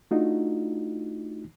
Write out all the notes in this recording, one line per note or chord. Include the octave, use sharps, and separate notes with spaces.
A3 D4 D#4 F4 F#4